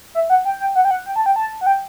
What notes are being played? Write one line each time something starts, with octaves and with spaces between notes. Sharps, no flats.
E5
F#5
G5
G5
F#5
G5
F#5
G5
A5
G5
A5
F#5
G5